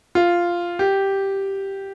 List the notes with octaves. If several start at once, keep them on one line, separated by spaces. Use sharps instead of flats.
F4
G4